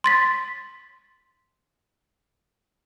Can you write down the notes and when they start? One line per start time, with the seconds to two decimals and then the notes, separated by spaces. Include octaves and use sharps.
0.04 C6 A6 B6